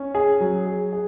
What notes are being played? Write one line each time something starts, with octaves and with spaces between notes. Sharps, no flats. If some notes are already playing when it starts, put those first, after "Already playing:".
Already playing: C#4
G#4
F#3
G#4
G#4